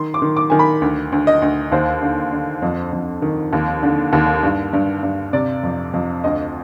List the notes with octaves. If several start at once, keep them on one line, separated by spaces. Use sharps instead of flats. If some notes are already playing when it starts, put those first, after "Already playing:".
Already playing: D#3 C6
D6
D#3
D6
D#3 G#5
B5
D2
D2
D#5
D2
D#2 C5
D3
D3
F2
F2
D#3
D#2
D3
D#2
G2
G2
G2
C3 D5
F2
F2
D2 D#5